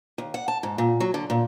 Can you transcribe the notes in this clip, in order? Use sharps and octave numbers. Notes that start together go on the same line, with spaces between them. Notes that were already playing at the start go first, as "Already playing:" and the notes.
D#2
F#5
A5
G#2
A#2
F#3
D3
A#2